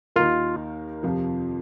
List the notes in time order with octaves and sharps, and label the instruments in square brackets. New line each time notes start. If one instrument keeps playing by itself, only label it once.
[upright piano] D#2 D#3 A#3 D#4 A#4 [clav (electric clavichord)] F4
[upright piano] F2 C3 F3 C4